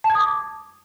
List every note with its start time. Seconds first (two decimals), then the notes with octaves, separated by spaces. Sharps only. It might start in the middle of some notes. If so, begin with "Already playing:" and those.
0.04 A5
0.10 G#6
0.15 D#6
0.20 D6